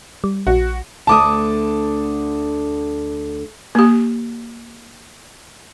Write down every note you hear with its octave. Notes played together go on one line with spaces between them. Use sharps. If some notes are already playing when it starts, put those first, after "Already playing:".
G3
A#1 F#4
D2 D3 A3 A5 D6 D#6
A#3 G4